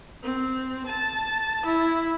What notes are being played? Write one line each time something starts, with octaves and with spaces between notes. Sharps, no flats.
C4
A5
E4